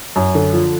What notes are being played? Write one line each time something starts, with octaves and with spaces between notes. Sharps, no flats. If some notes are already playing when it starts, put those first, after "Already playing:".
F#2
D3
F3